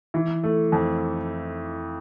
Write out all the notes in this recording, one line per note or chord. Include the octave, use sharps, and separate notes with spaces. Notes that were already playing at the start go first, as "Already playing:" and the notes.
E3
A3
F2